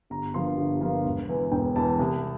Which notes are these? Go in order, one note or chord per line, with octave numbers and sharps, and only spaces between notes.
G1 A#5
G2 F3 A#3 C6
G1
G2 F3 A#3
E1
E2 E3
E1 G5
E2 E3 A5
C2